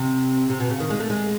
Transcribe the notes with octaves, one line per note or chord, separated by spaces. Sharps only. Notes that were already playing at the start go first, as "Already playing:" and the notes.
Already playing: C3
C3
B2
C#3
D#3
G#3
A3
G#3